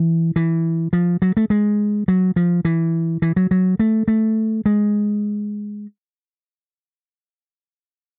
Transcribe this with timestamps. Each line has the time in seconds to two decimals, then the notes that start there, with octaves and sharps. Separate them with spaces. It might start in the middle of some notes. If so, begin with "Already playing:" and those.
Already playing: E3
0.36 E3
0.93 F3
1.22 F#3
1.37 A3
1.50 G#3
2.08 F#3
2.36 F3
2.65 E3
3.22 E3
3.36 F#3
3.51 F#3
3.79 A3
4.08 A3
4.66 G#3